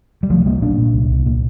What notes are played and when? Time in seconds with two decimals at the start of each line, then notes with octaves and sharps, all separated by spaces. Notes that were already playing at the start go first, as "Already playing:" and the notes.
0.23 G3
0.30 C2 F3 A3
0.46 C2 G3 A#3
0.62 A#2 A#3 D4
0.78 A#2
0.94 C2
1.10 C2
1.26 A#2